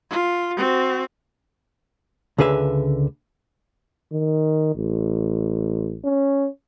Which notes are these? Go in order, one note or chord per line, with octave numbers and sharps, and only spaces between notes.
F4
C4 F#4
C#2 D3 G#4 B4 E5
D#3
A1
C#4